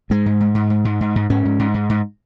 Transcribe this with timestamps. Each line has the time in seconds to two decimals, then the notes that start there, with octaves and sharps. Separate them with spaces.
0.10 G#2 G#3
0.26 G#2
0.41 G#2
0.55 G#2
0.70 G#2
0.85 G#2
1.01 G#2
1.16 G#2
1.30 G#2 C#4
1.45 G#2
1.59 G#2
1.74 G#2
1.90 G#2